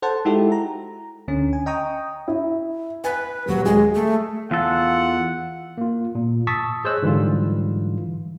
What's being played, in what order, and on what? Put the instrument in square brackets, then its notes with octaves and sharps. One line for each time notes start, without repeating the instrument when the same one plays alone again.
[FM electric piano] A4 C5 F#5 A5
G#3 D#4 E4 F#4 G4 A4
A#5
D2 D3 C#4
G#5
D#5 G5 A#5 C#6 D#6
[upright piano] E4
[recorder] B4 [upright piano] G#5
[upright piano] D#1 [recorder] F#3
[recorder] G#3 [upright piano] G#4
[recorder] A3
[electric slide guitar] E2 A4 [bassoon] F4 [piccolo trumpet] F#5
[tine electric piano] A#3 F4
A#2
A5 C#6 D#6 E6 A6 B6
G#4 C5 C#5 D#5 E6 F#6
G#2 D3 E3 F#3 G3 F4